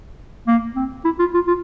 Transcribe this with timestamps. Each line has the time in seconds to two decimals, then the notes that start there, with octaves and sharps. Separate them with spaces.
0.47 A#3
0.76 C4
1.04 E4
1.19 F4
1.34 F4
1.47 F4